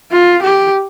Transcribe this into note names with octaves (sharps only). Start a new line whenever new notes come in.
F4
G4